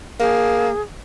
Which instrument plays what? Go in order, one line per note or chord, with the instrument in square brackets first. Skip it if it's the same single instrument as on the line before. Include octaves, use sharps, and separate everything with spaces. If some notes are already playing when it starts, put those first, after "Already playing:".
[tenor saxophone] A#3 [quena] G#4